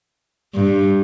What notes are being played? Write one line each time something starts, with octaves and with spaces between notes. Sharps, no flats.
G2